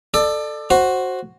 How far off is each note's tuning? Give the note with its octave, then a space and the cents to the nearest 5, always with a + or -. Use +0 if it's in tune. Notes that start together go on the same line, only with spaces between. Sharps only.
A4 +5 D5 +30
F#4 +0 C5 +15